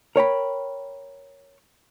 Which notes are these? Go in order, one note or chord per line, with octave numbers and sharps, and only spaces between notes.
A#4 C#5 G5 B5